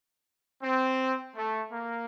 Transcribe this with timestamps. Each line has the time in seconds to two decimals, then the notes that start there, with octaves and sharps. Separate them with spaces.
0.63 C4
1.36 A3
1.73 A#3